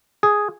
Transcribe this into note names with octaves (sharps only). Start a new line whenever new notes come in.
G#4